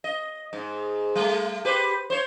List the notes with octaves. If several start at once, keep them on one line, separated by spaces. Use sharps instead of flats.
D#5
G#2
G3 A3
G4 B4 C5
C5 C#5